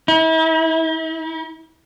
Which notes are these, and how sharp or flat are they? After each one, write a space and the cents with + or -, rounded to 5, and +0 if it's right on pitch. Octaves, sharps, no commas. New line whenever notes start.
E4 -40